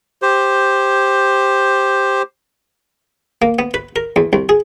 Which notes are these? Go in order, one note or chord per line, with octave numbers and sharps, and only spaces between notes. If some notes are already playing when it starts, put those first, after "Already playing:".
G4 C5
A#3
B3
B4
A#4
E2
C2
G#4